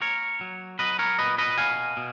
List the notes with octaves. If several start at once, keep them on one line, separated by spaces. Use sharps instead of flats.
A#3 A#4 C#5
F#3
F#3 B4 D#5
A#4 C#5
A#2 B4 D#5
B4 D#5
B2 F5 G#5
B2